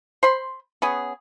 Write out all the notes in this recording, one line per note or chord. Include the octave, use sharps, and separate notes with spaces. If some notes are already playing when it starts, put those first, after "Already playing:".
C5 B5 C6
B3 C#4 G#4